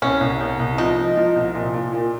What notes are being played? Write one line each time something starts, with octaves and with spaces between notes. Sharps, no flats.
C2 C#4
C2
C2
C2
F3 D#4
F3
F3
C2
A#2
A#2
A#2